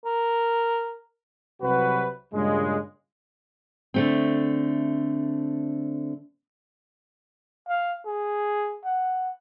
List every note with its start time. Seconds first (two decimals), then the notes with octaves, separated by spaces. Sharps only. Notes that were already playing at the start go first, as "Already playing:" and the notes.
0.05 A#4
1.62 C2 C3 F#3 F#4 B4
2.34 G2 A#2 C#3 G#3
3.94 D3 A3 C4
7.68 F5
8.06 G#4
8.85 F#5